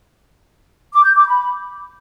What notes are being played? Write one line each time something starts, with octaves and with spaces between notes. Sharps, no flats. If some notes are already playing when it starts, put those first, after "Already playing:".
D6
G6
D6
B5